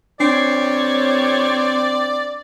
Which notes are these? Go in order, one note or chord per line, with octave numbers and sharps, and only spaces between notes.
F2 C4 D4 C#5 D5 C7